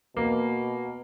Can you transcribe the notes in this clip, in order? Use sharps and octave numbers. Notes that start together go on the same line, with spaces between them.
B2 A#3